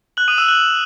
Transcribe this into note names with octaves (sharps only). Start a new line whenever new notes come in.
F#6 F#7
D#6 D#7
E6 E7
F#6 F#7